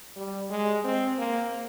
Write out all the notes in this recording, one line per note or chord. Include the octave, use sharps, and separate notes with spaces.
G3
G#3
C4
A#3